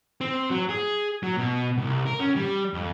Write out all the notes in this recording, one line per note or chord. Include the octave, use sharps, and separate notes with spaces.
C4
F#3
G#4
F#3
B2
C2
A#4
C#4
G3
F2